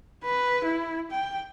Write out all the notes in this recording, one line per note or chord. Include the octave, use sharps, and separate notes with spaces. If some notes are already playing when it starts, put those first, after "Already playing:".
B4
E4
G5